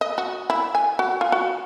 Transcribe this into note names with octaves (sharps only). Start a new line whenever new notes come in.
D#5
F#4
E4
G#5
F#4
F4
F#4